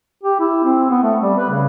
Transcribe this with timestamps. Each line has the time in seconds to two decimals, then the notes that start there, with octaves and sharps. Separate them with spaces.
0.23 G4
0.39 E4
0.64 C4
0.90 B3
1.03 A3
1.22 G3
1.38 B4
1.50 C#3